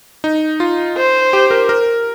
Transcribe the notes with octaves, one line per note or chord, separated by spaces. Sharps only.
D#4
F4
C5
G4
A#4
A#4